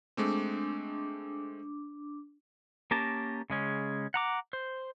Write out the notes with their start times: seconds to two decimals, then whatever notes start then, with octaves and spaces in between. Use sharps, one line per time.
0.17 G#3 A3 C4 D4 D6
2.91 A#3 C#4 G4 A#4 A5
3.50 C#3 G#3 C#4
4.14 F#5 A#5 D6
4.53 C5